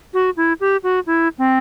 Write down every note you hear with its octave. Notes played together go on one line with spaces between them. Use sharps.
F#4
E4
G4
F#4
E4
C4